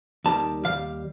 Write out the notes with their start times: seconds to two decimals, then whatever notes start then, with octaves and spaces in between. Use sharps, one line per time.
0.24 D#2 D#3 G3 A5
0.64 D#3 G3 F5
0.68 D#2